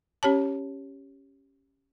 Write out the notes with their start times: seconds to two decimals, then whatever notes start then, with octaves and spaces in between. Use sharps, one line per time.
0.23 C#4 G4 C#5 A5